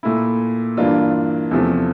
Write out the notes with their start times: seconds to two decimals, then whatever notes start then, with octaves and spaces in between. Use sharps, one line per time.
0.03 A#2 A3 E4
0.77 G2 E3 A#3 D4 F4
1.51 E2 C3 F3 A3